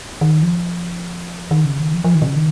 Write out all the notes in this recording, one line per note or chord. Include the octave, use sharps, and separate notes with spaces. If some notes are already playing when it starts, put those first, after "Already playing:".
D#3
F3
D#3
C#3
D#3
F3
F3
D#3
C3
C#3
D#3